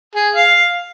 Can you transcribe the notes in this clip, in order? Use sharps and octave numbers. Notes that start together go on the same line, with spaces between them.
G#4
F5